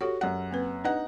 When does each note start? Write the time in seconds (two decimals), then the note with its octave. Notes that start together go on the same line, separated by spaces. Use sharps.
0.01 F#4 G4 A4 C#5
0.21 F#2 F#5
0.51 A#3 C4 B4
0.84 D4 D#4 B4 F#5